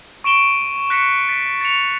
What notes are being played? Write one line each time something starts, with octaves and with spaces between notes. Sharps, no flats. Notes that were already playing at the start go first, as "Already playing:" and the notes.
C#6 D7 E7 G7
F#6 A#6 B6 C#7 E7
A6 B6
A6 C#7 F7